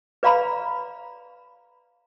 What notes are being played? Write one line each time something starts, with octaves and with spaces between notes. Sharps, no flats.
B4 D5 F5 A#5 B5